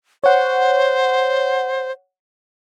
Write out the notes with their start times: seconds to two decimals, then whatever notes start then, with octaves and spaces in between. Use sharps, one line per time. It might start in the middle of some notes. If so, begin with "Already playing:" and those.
0.24 C5 C#5 F#5